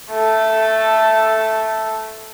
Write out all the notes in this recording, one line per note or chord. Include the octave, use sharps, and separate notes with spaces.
A3 A4